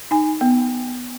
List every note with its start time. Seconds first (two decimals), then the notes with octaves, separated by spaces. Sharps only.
0.11 D#4 G#5
0.41 B3